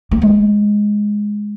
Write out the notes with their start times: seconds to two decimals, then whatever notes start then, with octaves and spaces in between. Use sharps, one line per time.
0.11 A#3
0.22 G#3